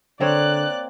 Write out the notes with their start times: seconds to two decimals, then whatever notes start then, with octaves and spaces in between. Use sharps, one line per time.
0.20 D3 A#3 C4 C#5 D5 F#6